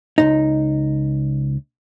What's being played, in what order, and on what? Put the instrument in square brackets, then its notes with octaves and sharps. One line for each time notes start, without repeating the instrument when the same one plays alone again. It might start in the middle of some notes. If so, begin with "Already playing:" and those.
[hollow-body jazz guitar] C#2 G2 D#4